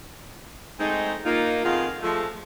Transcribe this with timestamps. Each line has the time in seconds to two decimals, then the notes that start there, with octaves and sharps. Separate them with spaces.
0.80 G#3 A3 C4 D#4
1.25 A#3 D#4 F4
1.65 F2 D#3 B3 F4 G#4 F5
2.03 F3 G#3 A3